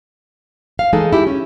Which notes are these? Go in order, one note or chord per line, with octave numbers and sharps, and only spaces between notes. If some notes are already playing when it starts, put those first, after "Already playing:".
F5
E3 G#3 D#4 A4
E4 G4
C#4